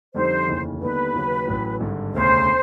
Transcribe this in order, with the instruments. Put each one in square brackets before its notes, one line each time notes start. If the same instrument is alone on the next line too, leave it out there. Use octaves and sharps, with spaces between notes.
[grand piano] F2 D3 G3 C4 D#4 [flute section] C5
[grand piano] F1 D#2 C#3 E3
[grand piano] D#2 D3 G3 B3 D#4 [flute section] B4
[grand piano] D#2 C#3 F#3 A#3 C#4
A1 A2 F#3
G#1 G2 D3
[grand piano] E1 D2 C#3 [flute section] C5